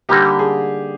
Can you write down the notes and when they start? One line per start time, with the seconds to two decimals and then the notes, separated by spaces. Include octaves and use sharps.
0.09 D3 G3 A#3 D#4 G4
0.39 G#4